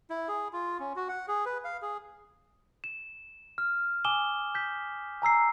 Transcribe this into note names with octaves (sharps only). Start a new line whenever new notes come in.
E4
G#4
F4
C#4
F#4
F#5
G#4
B4
F5
G#4
E7
F6
G#5 D6 D#6 E7 G7
G6 B6
G#5 A#5 E6 C7